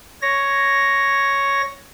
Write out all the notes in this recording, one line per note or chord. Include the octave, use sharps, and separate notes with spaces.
C#5 A#6